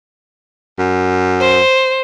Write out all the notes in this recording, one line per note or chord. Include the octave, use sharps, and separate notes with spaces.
F#2
C5